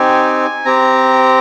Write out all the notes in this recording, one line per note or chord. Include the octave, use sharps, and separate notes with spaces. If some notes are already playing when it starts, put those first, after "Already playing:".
Already playing: C4 D#4 G4 G#5
C4 G4 A#5